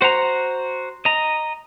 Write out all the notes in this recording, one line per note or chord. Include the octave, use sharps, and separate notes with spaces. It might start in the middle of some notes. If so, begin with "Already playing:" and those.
F#4 C5 F#5 A#5
D#5 A#5